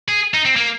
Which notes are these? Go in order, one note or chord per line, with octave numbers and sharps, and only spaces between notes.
G#4
D#4
C4
A#3